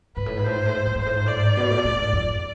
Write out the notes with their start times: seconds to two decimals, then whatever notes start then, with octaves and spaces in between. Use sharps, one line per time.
0.16 G#2 B4
0.26 A2
0.37 G#2
0.44 A2 C5
0.56 G#2
0.66 A2
0.76 G#2
0.86 A2
0.95 G#2
1.01 C5
1.06 A2
1.16 G#2
1.26 A2 D5
1.36 G#2
1.57 B2
1.70 A2
1.78 B2
1.84 A2
1.99 G#2
2.13 F2